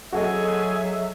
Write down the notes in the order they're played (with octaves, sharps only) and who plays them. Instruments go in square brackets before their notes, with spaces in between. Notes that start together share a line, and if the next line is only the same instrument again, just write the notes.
[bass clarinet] F#3 [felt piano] F#4 A4 D#5 [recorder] G#4 [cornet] E5